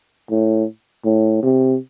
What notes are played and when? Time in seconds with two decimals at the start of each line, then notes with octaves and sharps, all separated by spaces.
0.30 A2
1.05 A2
1.43 C3